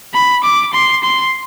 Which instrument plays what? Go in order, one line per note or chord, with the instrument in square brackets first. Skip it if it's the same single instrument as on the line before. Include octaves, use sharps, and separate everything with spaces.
[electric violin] B5
D6
C6
C6